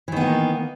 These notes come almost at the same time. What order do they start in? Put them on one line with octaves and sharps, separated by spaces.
E3 D#3 B3 A#3